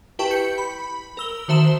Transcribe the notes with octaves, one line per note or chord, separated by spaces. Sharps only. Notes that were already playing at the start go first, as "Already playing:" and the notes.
E4 G4 B4 G5 A5 C#6
G6 C#7
B5
A#4 E6 G7
D#3 F#4 C5 E5 A5 E7